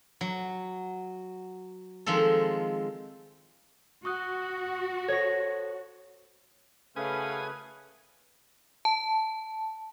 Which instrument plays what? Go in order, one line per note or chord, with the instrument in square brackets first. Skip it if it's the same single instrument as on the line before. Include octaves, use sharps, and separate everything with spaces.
[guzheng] F#3
D#3 F3 G#3 C4 A4
[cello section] F#4 [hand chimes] C#6 D#6 F#6
[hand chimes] A4 C5 [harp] C#5 A#6
[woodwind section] F#2 C#4 F5 [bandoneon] C#3 A3 [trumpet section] B4 [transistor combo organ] G#5 D#6
[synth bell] A5